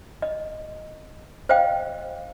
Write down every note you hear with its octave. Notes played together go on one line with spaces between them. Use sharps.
D#5
C5 D#5 F5 G5